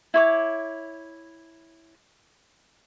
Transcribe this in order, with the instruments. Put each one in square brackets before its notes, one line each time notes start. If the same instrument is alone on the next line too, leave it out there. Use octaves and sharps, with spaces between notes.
[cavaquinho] E4 C#5 D6